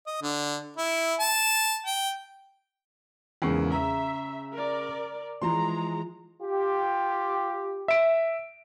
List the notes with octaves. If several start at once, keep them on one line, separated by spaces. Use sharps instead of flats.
D#5
D3
E4
A5
G5
E2 G#2 C#3 A#3 C#6 C7
E5 A#5
A#4 D5
E3 F3 G#3 A#5 C6
F4 G4
E5 D7